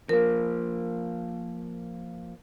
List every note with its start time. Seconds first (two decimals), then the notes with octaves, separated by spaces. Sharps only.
0.09 F3 A#3 A#4